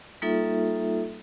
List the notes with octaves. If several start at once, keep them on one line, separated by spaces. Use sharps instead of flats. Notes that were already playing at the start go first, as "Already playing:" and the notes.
G3 A#3 D#4 F4 A4 E5